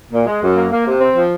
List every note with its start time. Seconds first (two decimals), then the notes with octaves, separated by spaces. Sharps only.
0.11 A#2
0.26 G#3
0.41 F#2
0.56 A#3
0.71 A#3
0.86 C3
1.00 C4
1.15 F3